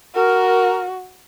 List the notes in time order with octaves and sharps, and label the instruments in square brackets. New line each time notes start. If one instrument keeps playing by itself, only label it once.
[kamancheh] F#4 [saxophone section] A#4